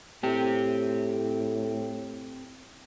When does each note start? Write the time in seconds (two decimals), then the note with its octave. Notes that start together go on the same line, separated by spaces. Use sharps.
0.23 A2 C4 G4